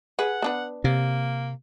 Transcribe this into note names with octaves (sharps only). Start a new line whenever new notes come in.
G#4 B4 F#5
B3 D4 B4
C3 A#3